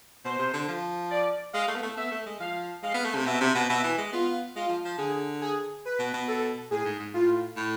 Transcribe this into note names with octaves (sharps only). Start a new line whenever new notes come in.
B2 C5
C3
D3
F3
D5
G#3 F5
A3
B3
A3
B3 E5
A3
G#3
F3 F5
G#3 F5
B3
A3
C3
B2 E5
C3
B2
B2 E5
E3
G#3
B3 F4
G#3 F4
F3
F3
D3 G#4
G#4
B4
B2
B2
A4
A2 G#4
G#2
G#2
A2 F4
A2